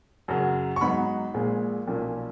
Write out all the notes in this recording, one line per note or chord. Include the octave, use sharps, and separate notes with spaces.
F#2 C#3 F#3
C#6
G#2 F#3 B3 D#4 B5
A#1 A#2 G#3
B1 A#2 F3 A#3 C#4